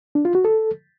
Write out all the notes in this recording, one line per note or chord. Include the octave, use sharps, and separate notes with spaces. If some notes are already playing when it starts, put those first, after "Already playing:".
D4
F4
F#4
A4